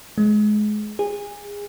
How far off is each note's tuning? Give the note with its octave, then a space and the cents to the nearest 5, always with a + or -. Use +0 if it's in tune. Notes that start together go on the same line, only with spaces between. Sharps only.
G#3 +25
G#4 -25